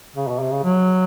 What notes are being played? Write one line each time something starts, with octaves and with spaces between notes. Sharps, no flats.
C#3
B2
C3
C#3
F#3